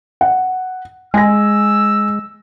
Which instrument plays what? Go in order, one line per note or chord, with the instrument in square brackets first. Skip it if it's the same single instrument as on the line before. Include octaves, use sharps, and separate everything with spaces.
[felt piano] F#5
[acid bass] G#3 [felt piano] G#5 A#6 [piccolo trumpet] E6